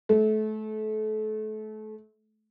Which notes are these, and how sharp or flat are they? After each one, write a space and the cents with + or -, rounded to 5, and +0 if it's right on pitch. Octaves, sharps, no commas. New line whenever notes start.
A3 -30